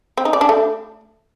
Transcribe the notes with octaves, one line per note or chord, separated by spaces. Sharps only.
C4
D#4
D5
D4
A3